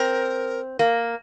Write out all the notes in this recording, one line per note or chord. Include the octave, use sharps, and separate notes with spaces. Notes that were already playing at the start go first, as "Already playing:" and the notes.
Already playing: C4 A#4
A#3